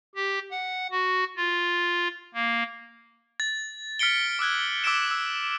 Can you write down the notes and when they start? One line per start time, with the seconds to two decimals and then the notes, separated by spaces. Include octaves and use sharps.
0.15 G4
0.51 F#5
0.91 F#4
1.37 F4
2.34 A#3
3.40 A6
3.99 F6 B6 C#7 D7 G7
4.39 D6 E6 F#6 G#6
4.84 D6 E6 B6 C#7 D7 E7
5.11 E6